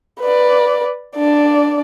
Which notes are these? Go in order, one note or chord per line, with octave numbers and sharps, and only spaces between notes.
B4 D5
D4 D5